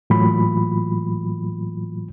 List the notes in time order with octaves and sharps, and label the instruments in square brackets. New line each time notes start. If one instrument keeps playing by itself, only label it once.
[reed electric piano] A2 E3 F#3 A#3 F4 B5